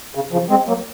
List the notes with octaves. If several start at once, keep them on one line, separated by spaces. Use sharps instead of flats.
C#3
C#3 F3
G#3 C4
F#3 A#3